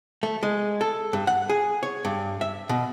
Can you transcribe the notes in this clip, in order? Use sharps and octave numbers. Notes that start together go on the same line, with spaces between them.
A3
G#3
A4
G2
F#5
G#4
C#5
G2
E5
B2